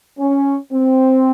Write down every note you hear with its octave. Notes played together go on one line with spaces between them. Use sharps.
C#4
C4